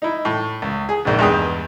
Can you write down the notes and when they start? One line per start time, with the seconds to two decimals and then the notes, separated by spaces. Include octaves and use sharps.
0.02 D#4 E4
0.25 A2
0.62 C#2
0.89 G#4
1.05 A#1 G#2
1.19 E2 G2 G#3 G5 D#6